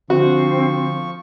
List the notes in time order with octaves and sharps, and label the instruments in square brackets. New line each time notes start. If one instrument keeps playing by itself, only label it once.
[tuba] D3 [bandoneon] F3 C#6 [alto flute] C4 [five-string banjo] F#4